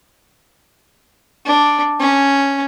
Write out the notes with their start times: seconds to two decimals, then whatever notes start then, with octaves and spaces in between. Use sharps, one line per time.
1.46 D4
2.00 C#4